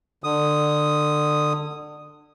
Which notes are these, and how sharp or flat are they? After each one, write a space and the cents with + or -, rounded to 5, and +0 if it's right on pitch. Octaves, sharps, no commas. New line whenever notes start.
D3 +25 D#6 +0